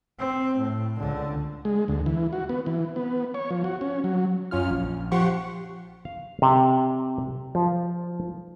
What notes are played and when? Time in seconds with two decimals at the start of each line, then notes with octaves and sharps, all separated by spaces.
0.19 C4
0.58 A2
0.97 C#2 D3
1.65 G#3
1.88 D2
2.06 E3
2.33 F#4
2.49 B3
2.66 E3
2.96 B3
3.34 C#5
3.50 F3
3.64 F#4
3.81 C#4
4.04 F#3
4.51 F#2 C#4 F4 F6
4.71 A#1
5.12 F3 G4 F#5 C6 C#6
6.05 F5
6.42 C3
7.55 F3